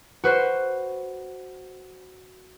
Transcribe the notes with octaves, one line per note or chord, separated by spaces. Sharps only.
F#4 B4 C5